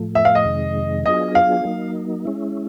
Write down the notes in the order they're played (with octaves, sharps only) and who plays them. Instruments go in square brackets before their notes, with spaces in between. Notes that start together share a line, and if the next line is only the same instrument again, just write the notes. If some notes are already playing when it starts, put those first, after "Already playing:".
Already playing: [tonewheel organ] A2 F3 A3
[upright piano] E5
F5
D#5
[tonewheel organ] F2 C3 D#3 G#3
[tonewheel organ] F#3 B3 D4 F4 G#4 [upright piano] D#5
[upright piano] F5
[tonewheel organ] F#3 A#3 D#4
G#3 C#4 E4